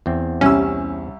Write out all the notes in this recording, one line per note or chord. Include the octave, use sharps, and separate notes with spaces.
E2 C4
C2 G3 C#4 E6